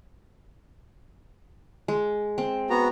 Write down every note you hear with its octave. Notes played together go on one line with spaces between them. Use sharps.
G#3
C4
B3 F#4 A#5